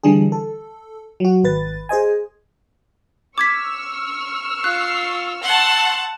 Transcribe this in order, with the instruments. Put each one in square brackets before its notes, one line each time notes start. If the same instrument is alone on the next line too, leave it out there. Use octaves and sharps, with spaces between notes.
[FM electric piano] D3 E3 G3 D4 G#4
A4
F#3 F#4
G#1 B4 A6
G#4 C5 D#5 G#5
[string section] C#6 E6 F6 [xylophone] D6 G#6 B6
[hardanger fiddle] F4 [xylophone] F#6 [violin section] C7
[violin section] F#5 A5 [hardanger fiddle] C6